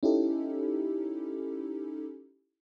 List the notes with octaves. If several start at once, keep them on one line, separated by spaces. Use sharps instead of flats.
C#4 D#4 E4 G4 A4